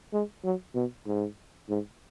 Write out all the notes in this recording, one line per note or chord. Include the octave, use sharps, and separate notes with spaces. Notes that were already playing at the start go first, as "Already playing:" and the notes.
G#3
F#3
B2
G#2
G#2